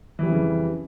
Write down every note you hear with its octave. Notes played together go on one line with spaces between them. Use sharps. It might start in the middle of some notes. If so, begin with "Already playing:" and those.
F2 C#3 E3 G3